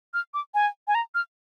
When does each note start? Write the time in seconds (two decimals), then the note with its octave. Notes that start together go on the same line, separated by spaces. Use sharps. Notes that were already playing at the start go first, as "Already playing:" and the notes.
0.14 F6
0.34 D6
0.54 G#5
0.88 G#5
0.95 A#5
1.15 F6